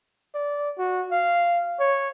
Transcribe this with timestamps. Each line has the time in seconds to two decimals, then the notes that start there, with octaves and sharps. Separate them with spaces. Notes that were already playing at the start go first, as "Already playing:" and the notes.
0.35 D5
0.78 F#4
1.11 F5
1.80 C#5